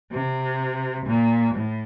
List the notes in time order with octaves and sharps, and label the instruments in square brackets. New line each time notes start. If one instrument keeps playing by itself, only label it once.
[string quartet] C3
A#2
A2